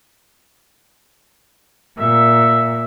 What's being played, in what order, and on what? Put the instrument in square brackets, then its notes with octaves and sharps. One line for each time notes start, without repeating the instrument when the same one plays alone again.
[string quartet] A#2 [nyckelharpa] E5